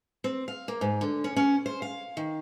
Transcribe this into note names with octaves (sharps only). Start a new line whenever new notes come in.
C4
F5
A#3
G#2
D3
C#4
C#4
C5
F5
D#3